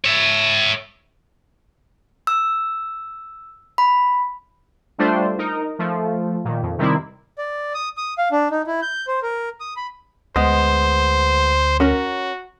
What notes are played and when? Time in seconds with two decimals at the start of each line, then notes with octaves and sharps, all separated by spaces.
0.05 C#5 E5
2.27 E6
3.78 B5
4.98 G3 A3 D4 F4 C5
5.38 D#4 A#4
5.79 F3 A3
6.45 A#2 D#3
6.62 F2
6.78 C3 D#3 G3 C4 E4
7.38 D5
7.74 D#6
7.97 D#6
8.18 F5
8.32 D4
8.51 D#4
8.67 E4
8.82 G6
9.07 C5
9.23 A#4
9.60 D#6
9.76 B5
10.36 D2 G#3 B3 C5
11.80 C#4 F#4 A#4